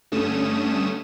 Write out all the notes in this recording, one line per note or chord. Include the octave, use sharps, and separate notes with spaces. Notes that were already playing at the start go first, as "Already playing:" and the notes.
G2 D3 A3 C#4 D#6 E7